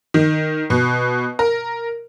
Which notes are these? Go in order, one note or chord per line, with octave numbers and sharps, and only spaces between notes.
D#3
B2
A#4